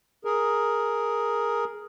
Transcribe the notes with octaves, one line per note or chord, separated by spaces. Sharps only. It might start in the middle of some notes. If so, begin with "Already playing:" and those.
G#4 A#4